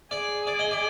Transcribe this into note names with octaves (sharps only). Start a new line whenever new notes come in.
G#4 D5
D5
D#5
D5